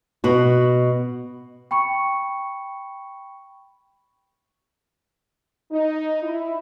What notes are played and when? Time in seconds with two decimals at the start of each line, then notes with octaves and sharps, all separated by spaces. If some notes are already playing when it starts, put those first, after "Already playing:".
0.24 B2 F#4
1.71 G5 B5 C#6 C#7
5.72 D#4
6.22 E4